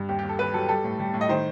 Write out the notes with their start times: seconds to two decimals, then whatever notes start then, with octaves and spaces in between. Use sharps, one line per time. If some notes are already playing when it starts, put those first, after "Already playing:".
Already playing: G2
0.09 D#2 G4
0.19 G4
0.23 D#2
0.29 A4
0.39 D#2 B4
0.54 F#3 A4
0.69 G3 A4
0.84 A2
1.00 G3
1.14 A2
1.21 D#5
1.29 D#3 C5